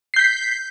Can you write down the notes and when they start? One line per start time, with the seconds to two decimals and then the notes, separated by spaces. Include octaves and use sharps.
0.14 C7
0.16 G6
0.19 B6